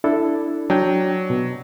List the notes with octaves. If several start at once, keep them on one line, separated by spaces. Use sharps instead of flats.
D4 E4 A4
F#3 D4 G5
B2